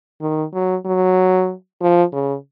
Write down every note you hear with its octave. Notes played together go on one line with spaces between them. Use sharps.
D#3
F#3
F#3
F3
C#3